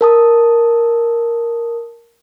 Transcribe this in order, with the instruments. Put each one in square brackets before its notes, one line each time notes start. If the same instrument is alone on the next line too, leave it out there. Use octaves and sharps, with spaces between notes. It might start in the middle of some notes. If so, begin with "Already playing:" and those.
[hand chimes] A#4 A5 D#6